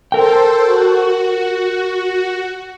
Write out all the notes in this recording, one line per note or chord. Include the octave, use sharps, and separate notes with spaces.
A4 A#4 C5 G5
F#4